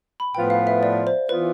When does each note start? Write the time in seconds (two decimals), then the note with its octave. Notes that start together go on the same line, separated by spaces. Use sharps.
0.20 B5
0.34 A2 F3 B3 F4 B4 G5
0.50 F5
0.67 E5
0.83 D5
1.07 C5
1.29 E3 B3 F4 B4